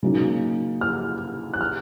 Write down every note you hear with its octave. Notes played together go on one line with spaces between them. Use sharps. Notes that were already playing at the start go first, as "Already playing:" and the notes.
C#3 F#3 A#3 D#4
F6
F#6
F6